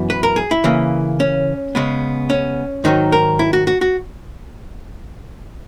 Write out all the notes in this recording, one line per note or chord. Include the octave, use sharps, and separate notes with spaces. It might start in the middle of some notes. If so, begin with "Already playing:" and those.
Already playing: F#2 E3 B3
B4
A#4
G#4
E4
C#3 E3 A#3
C#4
C#3 G#3 B3
C#4
G#2 D#3 F#3 D#4
A#4
E4
F#4
F#4
F#4